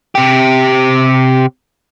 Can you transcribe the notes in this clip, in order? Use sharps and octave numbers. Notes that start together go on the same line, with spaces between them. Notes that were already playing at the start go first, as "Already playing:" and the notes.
C3 G4